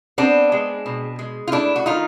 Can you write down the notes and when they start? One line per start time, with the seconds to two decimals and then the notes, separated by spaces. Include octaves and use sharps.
0.18 B3 C4 D4
0.52 G#3
0.86 B2
1.19 G#3
1.47 F4
1.52 A3 D4 E4
1.76 F#4
1.86 D#3 D#4 F4